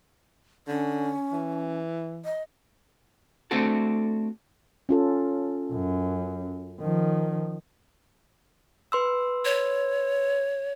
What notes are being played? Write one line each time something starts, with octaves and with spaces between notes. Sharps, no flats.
D3 C#4
E3
D#5
A3 C4 D4 F#4 A4
C#4 F4 A4
F#2
D#3 F3
B4 C6 E6
C#5